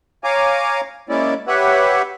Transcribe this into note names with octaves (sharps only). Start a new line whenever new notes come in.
C#5 F5 G#5 A#5 D6
G#3 A#3 C#4 E4 D5
G4 B4 C#5 E5 F#5